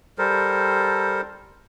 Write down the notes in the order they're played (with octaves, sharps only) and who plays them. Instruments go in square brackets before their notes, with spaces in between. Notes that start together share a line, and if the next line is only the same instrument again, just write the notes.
[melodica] G3 A4 A#4 C5